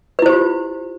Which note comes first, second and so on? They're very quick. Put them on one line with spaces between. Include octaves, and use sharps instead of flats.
B4 E4 C5 G4 F4